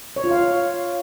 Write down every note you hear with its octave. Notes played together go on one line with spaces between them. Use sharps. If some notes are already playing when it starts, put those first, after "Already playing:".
C#5
F4
F5